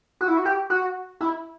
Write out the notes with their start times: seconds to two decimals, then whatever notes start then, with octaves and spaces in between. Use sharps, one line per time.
0.21 F#4
0.28 E4
0.37 F#4
0.45 G4
0.70 F#4
1.21 E4